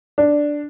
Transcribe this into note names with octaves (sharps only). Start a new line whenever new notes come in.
D4